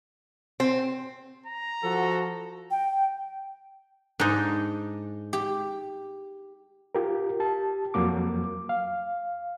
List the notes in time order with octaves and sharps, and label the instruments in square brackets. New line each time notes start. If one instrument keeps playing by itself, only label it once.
[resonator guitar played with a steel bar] C4
[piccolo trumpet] A#5
[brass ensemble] F3 F#4 A4
[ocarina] G5
[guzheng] G#2 [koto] D4 D#4
[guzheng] G4
[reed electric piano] F4 G4 A#4
G4 A5
F2 F#3 A#3 D6
F5